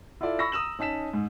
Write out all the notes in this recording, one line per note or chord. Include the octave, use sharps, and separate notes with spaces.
E4 F4 A4 D5 E5
B5 C#6 E6 A#6
A#5 D#6 E6 E7 F#7
C#4 D#4 A5 B6 E7
G#2